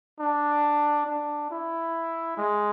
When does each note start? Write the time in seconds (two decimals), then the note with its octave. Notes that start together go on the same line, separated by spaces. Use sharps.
0.20 D4
1.06 D4
1.51 E4
2.38 G#3